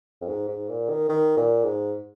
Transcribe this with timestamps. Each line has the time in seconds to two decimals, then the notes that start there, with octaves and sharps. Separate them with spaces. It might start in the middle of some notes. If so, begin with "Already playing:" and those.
0.22 F2
0.28 G#2
0.48 G#2
0.69 A#2
0.90 D#3
1.09 D#3
1.37 A#2
1.64 G#2